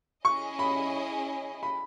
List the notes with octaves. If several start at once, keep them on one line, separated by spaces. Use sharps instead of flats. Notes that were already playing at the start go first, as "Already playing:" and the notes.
C#4 E4 G#4 D#5 C#6
B5
B5